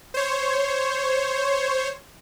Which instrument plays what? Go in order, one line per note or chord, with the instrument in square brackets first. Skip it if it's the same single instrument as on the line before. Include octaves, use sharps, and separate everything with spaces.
[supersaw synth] C5 C#5